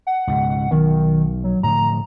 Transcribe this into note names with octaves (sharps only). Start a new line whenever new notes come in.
F#5
C#2 G#2 B2
B1 D#3
F#3
A2 D3 F3 A#5